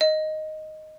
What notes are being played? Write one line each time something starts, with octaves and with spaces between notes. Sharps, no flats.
D#5